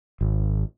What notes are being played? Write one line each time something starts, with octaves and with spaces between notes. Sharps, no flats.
G#1